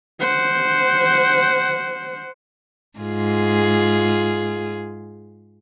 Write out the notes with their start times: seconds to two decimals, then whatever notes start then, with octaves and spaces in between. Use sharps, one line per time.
0.21 C5 F#5
2.99 G#2 F4 G#4